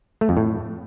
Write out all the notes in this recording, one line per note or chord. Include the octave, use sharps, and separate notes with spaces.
A3
F2
A2